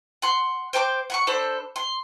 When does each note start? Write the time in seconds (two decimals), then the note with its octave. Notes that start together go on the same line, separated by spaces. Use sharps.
0.22 F#5 C6
0.73 C5 G5 A5 D6
1.10 F#5 B5 C#6
1.27 D4 A4 C5 B5
1.76 C6